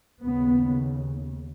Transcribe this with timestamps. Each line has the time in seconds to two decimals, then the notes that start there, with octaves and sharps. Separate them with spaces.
0.23 D#2 C#3 B3